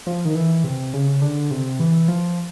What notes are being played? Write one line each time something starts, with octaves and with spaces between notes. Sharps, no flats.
F3
D#3
E3
C3
C#3
D3
C3
E3
F3